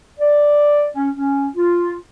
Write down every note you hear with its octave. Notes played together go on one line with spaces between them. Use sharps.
D5
C#4
C#4
F4